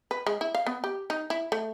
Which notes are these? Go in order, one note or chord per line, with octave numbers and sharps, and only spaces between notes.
B4
G#3
E4
F5
B3
G4
D#4
E4
A3